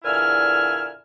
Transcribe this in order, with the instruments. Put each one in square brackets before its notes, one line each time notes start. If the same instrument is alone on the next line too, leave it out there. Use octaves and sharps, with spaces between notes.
[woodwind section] E2 A#2 D3 E4 G#5 F6